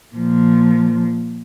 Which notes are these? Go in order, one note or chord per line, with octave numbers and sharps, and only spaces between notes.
A#2 F3